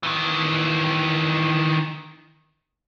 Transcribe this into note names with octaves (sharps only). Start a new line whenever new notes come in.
D#3 E3